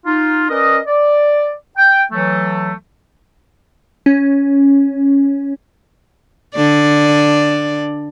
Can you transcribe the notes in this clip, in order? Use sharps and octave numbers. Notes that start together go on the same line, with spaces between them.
D#4 F4
C#4 A#4 B4 D5 D#5
D5
G5
E3 F#3 A3
C#4
D3 D5